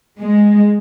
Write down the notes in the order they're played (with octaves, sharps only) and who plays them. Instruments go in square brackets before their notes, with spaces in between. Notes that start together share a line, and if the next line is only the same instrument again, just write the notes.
[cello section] G#3